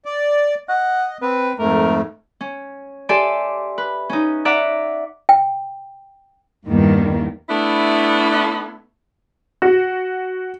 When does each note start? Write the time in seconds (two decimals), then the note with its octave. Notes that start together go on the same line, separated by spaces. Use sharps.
0.05 D5
0.69 D#5 F#5
1.22 C4 B4
1.59 F2 G#2 A3 A#4
2.41 C#4
3.09 G4 A4 D5 E5 G#5 C6
3.78 B4
4.10 C#4 D#4
4.45 D5 E5 F#5 A#5 D6
5.29 G5
6.67 E2 G2 D#3 G3 A#3
7.49 A3 B3 D4 E4
9.62 F#4